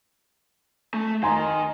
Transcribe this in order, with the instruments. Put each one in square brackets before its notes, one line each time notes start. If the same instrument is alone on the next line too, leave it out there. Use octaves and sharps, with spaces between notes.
[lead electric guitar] A3
[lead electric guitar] D#3 [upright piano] G#5 A#5 C6